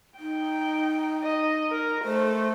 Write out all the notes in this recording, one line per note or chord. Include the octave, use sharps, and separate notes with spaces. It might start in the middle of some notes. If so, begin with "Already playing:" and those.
D#4 G5
D#5
A#4
A3 C5